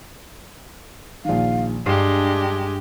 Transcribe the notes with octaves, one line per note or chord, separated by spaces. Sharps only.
A#1 D#3 F5
G2 G#3 D4 G4 C7